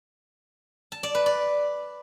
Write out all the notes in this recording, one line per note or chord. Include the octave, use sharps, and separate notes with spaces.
A5
D5
B4
D5